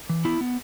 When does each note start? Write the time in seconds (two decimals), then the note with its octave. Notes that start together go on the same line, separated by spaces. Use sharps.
0.09 E3
0.25 B3 E4
0.41 B3